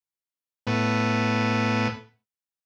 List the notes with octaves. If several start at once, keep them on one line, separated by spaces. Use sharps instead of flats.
A2 B3